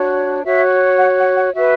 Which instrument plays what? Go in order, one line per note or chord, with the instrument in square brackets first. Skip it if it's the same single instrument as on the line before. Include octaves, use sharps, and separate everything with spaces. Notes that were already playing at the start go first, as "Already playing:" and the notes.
Already playing: [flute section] D4 F#4 C#5
F#4 C#5 E5
F#5
F#5
F#5
F#4 B4 E5